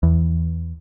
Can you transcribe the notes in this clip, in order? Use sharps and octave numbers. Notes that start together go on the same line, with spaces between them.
E2